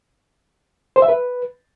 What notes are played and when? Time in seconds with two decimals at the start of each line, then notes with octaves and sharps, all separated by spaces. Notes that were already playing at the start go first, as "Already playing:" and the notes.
0.96 C5
1.02 E5
1.08 B4